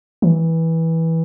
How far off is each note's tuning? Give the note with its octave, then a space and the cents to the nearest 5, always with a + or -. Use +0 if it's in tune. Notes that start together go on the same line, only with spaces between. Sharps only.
E3 -15